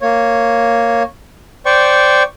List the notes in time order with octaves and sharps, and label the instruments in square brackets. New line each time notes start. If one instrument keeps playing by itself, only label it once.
[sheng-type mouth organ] A#3 C#5
C5 D5 G5 C#6